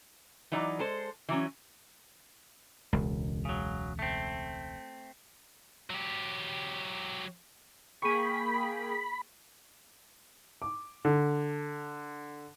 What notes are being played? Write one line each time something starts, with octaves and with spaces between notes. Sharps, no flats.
E3 F#3 D#4 D5
G#3 A4 C5
E3 F#3 C#4
E1 C#2
C#3 F#3
A3 C4
F#3 G4
A#3 G#4 G5 B5 C#6 D#7
D6
D3